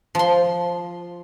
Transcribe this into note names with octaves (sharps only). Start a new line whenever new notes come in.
F3 C6